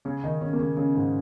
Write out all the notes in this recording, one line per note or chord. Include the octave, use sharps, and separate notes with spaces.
C#3 C#4
D#3 D#4
C#3 C#4
A#3
C#3 C#4
C#3 C#4
G#2 G#3